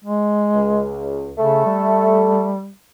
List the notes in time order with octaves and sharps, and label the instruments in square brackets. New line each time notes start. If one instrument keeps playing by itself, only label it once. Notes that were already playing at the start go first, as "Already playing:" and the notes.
[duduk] G#3
[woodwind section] C#2
[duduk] C#3 [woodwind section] A3 A4
[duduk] G3